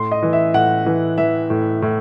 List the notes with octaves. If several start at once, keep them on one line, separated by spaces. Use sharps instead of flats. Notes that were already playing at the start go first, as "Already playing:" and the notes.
Already playing: A2 C6
D#5
E3
E5
A2 F#5
E3
E3 E5
A2
A2